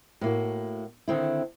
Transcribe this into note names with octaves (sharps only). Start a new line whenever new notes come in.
A2 A#3 F#4
D3 D#3 C4 E4